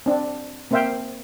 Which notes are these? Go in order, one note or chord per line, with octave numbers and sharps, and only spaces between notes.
C4 D4
A#3 C4 C5 E5 F5 G5